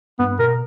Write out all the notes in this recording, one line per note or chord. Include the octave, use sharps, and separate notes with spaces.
G2 B3
B2 A#4